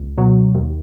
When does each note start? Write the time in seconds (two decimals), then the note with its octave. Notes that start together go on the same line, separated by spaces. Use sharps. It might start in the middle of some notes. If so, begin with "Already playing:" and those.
Already playing: C#2
0.18 B2 F#3
0.55 D#2